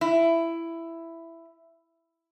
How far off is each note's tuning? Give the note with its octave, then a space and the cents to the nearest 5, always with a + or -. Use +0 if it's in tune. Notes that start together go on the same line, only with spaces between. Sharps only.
E4 +10